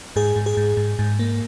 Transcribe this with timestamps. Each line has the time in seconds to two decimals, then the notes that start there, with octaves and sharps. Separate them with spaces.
0.16 G#2 G#4
0.36 G#2
0.46 G#4
0.57 G#2
0.77 G#2
0.99 G#2
1.19 A#3